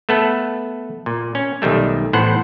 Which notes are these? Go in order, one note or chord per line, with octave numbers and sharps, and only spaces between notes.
A3 B3 A4
A#2
C#4
B1 D#3 G3 A3
A1 A2 B3 C5 F#5